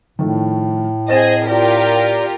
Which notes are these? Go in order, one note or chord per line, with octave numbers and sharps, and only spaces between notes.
A2 D#3 F3 A3
C4 G#4 C5 D#5 A6 E7
F4 G4 A#4 D5